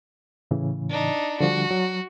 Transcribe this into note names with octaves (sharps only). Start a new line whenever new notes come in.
A2 C#3 E3
D4 D#4
D3 F3 G3 F#4
F#3